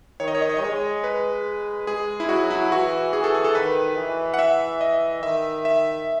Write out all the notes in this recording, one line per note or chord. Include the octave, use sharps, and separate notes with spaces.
D#3 C#5
D#5
C#5
D#5
C#5
D#5
G#3 C#5
B4
G#3 G#4
E4
F#3 F#4
E4
E3 F#4
E3 G#4
A4
G#4
A4
D#3 B4
E3
F#5
E5
D#5
D#3 E5
E5